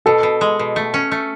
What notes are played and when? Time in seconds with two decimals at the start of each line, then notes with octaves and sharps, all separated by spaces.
0.06 B2 A4
0.23 B2
0.41 G#3
0.59 B2
0.76 A3
0.94 C#4
1.12 A3